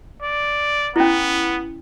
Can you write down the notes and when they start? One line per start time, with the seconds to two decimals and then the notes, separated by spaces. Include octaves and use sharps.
0.22 D5
0.96 B3 C#4 E4